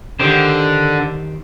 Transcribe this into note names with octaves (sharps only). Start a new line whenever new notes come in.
D3 D#3 G4 C5